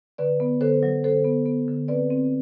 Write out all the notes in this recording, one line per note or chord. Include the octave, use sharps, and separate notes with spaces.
D3 B4 D5
B3
D3 A4 C5
F#3
D3 A4 C5
B3
B3
D3
C4 B4 D5
C4